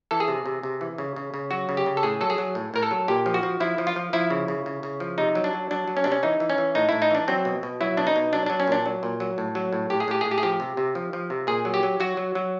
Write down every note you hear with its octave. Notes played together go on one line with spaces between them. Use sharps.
E3 A4
G#4
C3
C3
C3
E3
C#3
C#3
C#3
F#3 F#4
C#3
G4
C#3
A4
A2 G#4
F#3 A4
G#4
F#3
A2
A2 A#4
A4
F#3
A#2 G4
F3
F#4
F3
F3 E4
F3
F4
F3
F3 E4
C#3
C#3
C#3
C#3
F3
C3 D#4
F#3
D4
F#3
F#3 D4
F#3
C#4
C3 D4
C#4
E3 D#4
E3
C#4
E3
A2 D#4
A2 E4
D#4
E3 D4
F#3 C4
B2
B2
F#3 E4
B2 D4
D#4
B2
F#3 D4
F#3 D4
C#4
A#2 D4
F#3
A#2
F#3
A2
F#3
A2
A2 G4
G#4
A2 G4
A2 G#4
G4
G#4
F3 G4
C3
C3
F3
F3
C3
A#2 G#4
F#3
G4
F#3
F#3 F#4
F#3
F#3